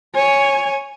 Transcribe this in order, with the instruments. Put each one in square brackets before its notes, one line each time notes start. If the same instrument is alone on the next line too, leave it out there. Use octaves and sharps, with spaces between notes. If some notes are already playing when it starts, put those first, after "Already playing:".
[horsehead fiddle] C#5 G#5